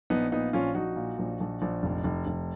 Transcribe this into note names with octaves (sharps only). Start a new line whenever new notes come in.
A#1 B3 D#4
A#2 B3 D#4
A#1 C#4 F4
A#1 D#4 F#4
A#2
A#1
A#1
A#1
F1
F1
F1